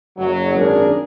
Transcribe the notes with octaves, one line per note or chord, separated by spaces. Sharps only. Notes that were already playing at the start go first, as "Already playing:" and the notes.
F#1 F#3
G#1 F#2 D4 G#4 A#4